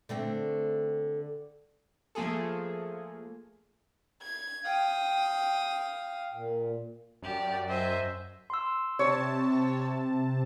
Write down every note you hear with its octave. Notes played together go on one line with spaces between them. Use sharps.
D3 A3 C4
F3 A3 A#3 F4 G#4 A4
G#6
F5 G5 D#6
A#2
F#2 G4 D5
C5 D#5 E5 G#5
C6 E6
C3 C#5 A5